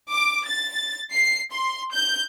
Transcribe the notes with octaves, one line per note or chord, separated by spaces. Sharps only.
D6
A6
C7
C6
G6